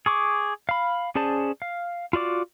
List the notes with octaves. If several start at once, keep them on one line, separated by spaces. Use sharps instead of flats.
G#4 C#6 D6
F5 B5
C#4 G#4 C5 D5 A5
F5
F4 F#4 D5 D6